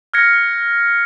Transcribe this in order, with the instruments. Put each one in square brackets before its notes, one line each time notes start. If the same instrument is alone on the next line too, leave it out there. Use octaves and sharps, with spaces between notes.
[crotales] F6 F#6 G#6 A#6 C#7